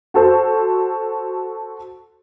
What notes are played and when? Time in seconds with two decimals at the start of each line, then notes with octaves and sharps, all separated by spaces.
0.14 F#4 A4 C5